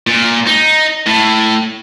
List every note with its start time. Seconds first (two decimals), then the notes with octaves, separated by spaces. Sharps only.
0.07 A#2
0.47 D#4
1.06 A2